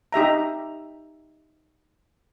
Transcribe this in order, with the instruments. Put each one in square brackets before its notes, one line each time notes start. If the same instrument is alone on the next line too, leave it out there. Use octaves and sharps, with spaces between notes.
[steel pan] D#4 G4 E5 A#5